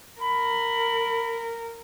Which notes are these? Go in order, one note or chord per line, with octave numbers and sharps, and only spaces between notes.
A#4 B5